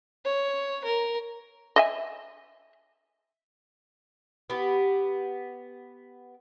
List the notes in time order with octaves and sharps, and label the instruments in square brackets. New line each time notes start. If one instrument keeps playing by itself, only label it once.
[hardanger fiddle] C#5
A#4
[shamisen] D#5 E5 G#5
[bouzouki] B3 G4